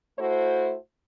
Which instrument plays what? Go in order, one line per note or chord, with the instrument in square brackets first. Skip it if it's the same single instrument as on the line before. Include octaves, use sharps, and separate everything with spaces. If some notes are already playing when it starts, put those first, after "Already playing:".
[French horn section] A3 E4 F#4 A4 C5